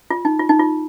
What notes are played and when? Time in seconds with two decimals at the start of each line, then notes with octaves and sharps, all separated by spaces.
0.10 F4
0.25 D#4
0.39 F4
0.49 D#4
0.59 F4